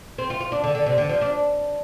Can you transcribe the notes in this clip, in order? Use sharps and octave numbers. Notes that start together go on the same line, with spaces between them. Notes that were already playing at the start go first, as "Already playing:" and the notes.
C4
F4
F4
D4
D3
D3
C3
D3
F3
D4